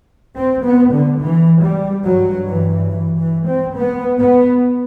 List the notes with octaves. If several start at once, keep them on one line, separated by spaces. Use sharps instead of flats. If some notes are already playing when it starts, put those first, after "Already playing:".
C4
B3
D3
E3
G3
G2 F#3
E3
E3
E3
C4
B3
B3